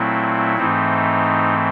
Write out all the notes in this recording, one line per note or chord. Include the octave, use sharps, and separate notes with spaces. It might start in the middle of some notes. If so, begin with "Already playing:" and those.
Already playing: A#2 F#3 A3 C4 E4
G#2 E3 A3 C4 D#4